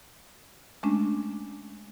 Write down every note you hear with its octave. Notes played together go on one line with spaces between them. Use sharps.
G#3 A3 C#4 D4